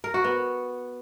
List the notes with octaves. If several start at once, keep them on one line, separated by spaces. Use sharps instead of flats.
A#4
F#4
B3